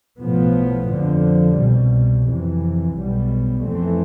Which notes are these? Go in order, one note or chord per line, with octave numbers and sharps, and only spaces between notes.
B1 A2 F3 B3
F2 D3 F3
C2 B2 G3
F2 C3 E3
B1 B2 G3 B3
F2 E3 A3 C4